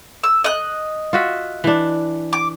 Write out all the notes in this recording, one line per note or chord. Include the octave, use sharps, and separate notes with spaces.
E6
D#5 F#6
F4 F#4 E5
E3 D4
D6